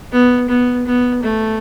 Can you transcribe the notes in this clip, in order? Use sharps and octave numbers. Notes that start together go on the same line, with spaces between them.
B3
B3
B3
A3